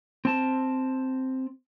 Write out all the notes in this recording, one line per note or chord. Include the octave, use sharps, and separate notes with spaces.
C4 A5